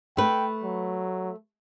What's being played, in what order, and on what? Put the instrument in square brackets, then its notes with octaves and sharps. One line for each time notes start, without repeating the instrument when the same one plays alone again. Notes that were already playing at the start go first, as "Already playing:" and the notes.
[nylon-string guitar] A3 B4 [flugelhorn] G5
[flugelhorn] F#3